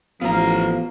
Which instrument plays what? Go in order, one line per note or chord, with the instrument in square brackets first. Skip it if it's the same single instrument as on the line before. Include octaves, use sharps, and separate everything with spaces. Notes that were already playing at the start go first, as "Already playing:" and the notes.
[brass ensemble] A1 [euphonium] F3 [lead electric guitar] B3 A#5 [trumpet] F5